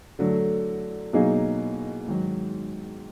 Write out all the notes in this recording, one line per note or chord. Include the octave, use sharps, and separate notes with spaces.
D3 F#3 A3
B2 F#3 A#3 D#4 G#4
G#2 D#3 F#3